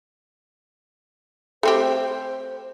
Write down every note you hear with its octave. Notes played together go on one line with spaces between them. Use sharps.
A3 C4 G4 C5